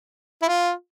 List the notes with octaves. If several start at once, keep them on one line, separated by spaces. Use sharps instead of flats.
E4
F4